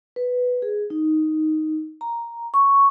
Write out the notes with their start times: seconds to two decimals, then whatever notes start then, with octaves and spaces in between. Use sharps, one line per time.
0.16 B4
0.62 G#4
0.90 D#4
2.01 A#5
2.54 C#6